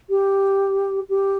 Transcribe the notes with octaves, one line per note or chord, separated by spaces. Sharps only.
G4
G4